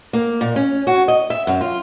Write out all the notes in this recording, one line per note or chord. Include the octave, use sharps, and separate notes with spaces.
A#3
A#2
C#4
F#4
D#5
E5
F#2
F4